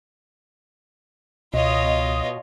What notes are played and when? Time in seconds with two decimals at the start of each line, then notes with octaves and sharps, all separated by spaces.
1.53 C#2 B2 F4 C#5 D#5